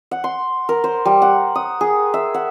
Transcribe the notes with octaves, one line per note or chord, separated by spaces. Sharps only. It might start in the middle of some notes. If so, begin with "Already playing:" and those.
F#5
C6
A#4
C5
G3
F#5
D#6
G#4
E5
F#5